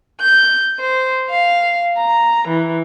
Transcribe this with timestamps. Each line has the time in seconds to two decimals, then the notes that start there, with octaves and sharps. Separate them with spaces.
0.20 G6
0.78 C5
1.29 F5
1.97 A#5
2.48 E3